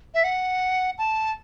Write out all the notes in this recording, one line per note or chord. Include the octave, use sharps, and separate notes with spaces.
E5
F#5
A5